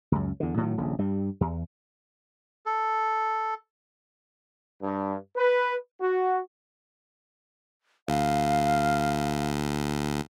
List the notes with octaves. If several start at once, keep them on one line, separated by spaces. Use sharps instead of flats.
C#2 F#2
E2 D3
A2 D#3 F#3
D#1 A#1 C#3
G2 G3
E2
A4
G2
B4
F#4
D2 F5